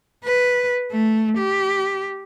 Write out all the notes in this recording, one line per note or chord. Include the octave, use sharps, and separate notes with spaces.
B4
A3
G4